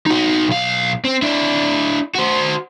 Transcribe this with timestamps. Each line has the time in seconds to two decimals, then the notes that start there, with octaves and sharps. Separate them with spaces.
0.06 D#4 F#4
0.48 B1 F5
1.05 C4
1.22 D4 E4
2.15 F#4 C5